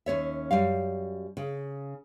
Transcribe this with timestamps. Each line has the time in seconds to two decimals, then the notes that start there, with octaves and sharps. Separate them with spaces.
0.06 D#2 C#4 C#5 E5
0.51 F#2 G3 F5
1.37 C#3